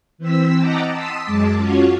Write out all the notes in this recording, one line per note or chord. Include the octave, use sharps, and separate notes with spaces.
E3 C4 E6 B6
D#5 F#5 G5 A5 A#5 D6
A5 C6 D#6 E6 B6
F#2 G#3 A5 D6
C#4 F4 F#4 C#5